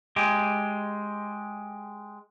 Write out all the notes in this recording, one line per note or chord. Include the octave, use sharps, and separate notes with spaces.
G#3 G4